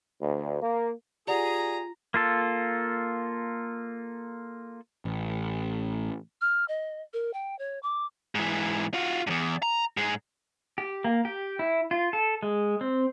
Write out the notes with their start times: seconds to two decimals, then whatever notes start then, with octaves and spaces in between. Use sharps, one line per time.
0.21 D2
0.62 A#3
1.27 F4 G4 G#4 D5 F#5 A#5
2.14 A#3 F4 A4
5.05 A1
6.41 F6
6.68 D#5
7.13 A#4
7.34 G5
7.59 C#5
7.83 D6
8.35 G#2 E3
8.94 F4 F#4
9.27 E2 G2
9.63 A#5
9.97 G#2 G#3
10.78 G4
11.04 A#3
11.25 G4
11.59 E4
11.91 F4
12.13 A4
12.43 G#3
12.81 C4